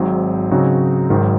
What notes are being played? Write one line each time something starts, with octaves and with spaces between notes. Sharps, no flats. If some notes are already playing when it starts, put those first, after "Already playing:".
Already playing: G#1 G#2 F#3 C4
C#3 F#3 C4 D#4 F#4
G#1 G#2 D#3 F#3